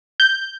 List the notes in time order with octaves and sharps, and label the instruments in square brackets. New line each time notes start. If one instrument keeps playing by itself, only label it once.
[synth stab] G6